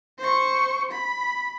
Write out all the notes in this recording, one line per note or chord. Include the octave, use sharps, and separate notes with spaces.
C5 C#6
B5